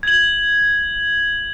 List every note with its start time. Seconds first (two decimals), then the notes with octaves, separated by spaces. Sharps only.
0.03 G#6 F#7